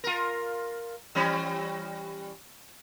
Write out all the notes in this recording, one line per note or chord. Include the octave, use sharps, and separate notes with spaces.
F4 A#4
E3 G3 C#4